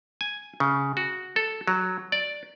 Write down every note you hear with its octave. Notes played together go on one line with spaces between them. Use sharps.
G#5
C#3
F#4
A4
F#3
D5